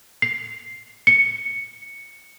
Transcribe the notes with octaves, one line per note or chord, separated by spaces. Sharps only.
C7
C#7